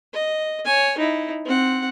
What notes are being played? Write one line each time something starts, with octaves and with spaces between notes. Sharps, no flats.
D#5
C#5 G#5
D#4 E4
C4 F#5